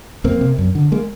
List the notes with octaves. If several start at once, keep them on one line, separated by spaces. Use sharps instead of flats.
F2 A#3 C4
C3
F#2
D3
G#3 A#3